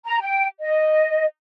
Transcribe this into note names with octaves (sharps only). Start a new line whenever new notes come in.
A#5
G5
D#5